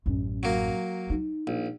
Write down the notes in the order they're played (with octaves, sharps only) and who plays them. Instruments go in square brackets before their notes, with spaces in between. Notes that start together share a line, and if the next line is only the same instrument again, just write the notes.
[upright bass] A1 F#2
[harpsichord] F#3 A#3
[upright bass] D#4
[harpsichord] A#1